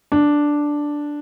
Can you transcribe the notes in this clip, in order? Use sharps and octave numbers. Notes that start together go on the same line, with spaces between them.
D4